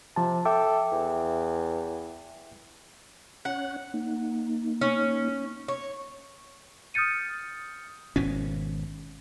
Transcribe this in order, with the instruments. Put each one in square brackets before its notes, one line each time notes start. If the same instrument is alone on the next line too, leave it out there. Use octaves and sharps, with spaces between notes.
[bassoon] C3 [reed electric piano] F3 A5
[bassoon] A4 [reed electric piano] E5 G5 D6
[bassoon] E2
[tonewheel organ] C#4 C#5 F#6 [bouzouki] F#5
[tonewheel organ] A#3 D#4
[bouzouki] C#4
C#5
[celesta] D#6 F6 G6 A6 C#7 D#7
[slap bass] G#1 B2 C#4